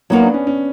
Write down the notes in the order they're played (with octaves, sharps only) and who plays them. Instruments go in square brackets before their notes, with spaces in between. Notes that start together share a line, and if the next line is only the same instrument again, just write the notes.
[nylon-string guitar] F#3 A#3 D#4 F#4 A#4 [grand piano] B3
[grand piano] D4
C#4
C#4